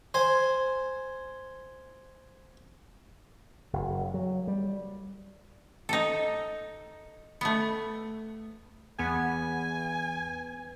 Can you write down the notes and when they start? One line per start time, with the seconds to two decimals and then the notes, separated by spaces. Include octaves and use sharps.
0.14 C5 G#5
3.73 F#1
4.14 F#3
4.47 G3
5.89 D#4 A4
7.41 A3 B3
8.99 E2 B3 G#5